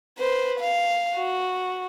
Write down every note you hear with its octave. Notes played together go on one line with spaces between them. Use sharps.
B4 C5
F5
F#4